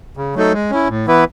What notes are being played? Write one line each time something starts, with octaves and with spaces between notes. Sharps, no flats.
C#3
F#3 A3 D#4 A4
G#3
C#4 E4
A2
E3 B3 E4 B4